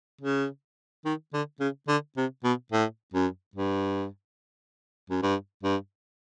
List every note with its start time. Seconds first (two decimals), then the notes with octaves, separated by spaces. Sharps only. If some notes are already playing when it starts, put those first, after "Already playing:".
0.21 C#3
1.05 D#3
1.33 D3
1.60 C#3
1.88 D3
2.17 C3
2.44 B2
2.72 A2
3.14 F#2
3.56 G2
5.10 F#2
5.22 G2
5.63 G2